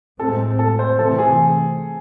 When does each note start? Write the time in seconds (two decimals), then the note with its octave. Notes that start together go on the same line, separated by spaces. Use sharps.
0.19 A2 G#3 C4 A4
0.59 A4
0.79 C5
0.98 C3 E3 A3 C4 A4
1.18 G#4